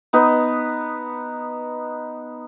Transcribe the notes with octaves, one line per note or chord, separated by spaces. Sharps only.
B3 D#4 B4